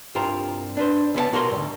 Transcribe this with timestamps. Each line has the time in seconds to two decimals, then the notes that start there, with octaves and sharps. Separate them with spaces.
0.15 C2 G2 F4 A#4 C5 A#5
0.77 D4 B4 C5
1.14 C#2 B3 F4 A5
1.32 B2 F#4 A#4 E5 C6
1.51 D2 G2